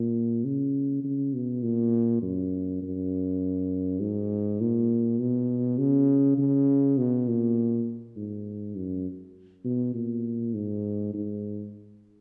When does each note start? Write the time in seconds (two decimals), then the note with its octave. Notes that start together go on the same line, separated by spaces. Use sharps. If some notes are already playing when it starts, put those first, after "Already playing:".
Already playing: A#2
0.45 C#3
1.04 C#3
1.34 B2
1.62 A#2
2.22 F#2
2.82 F#2
4.00 G#2
4.61 A#2
5.19 B2
5.78 C#3
6.38 C#3
6.98 B2
7.28 A#2
8.16 G#2
8.76 F#2
9.65 B2
9.94 A#2
10.54 G#2
11.14 G#2